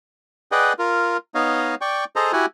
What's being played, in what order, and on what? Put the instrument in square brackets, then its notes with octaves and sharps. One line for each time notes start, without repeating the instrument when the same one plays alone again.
[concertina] G#4 B4 D5 D#5 F#5 G5
F4 A#4
B3 D#4 C#5 D#5 F5
D5 G5 C#6
G#4 A4 C5 D#5 A#5
E4 F#4 G4 F#5 G#5